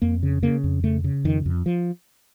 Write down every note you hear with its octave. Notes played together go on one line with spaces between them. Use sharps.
F2 A#3
C#3
C#3 A#3
F2
C#3 A3
C#3
F2 D#3
F2
F3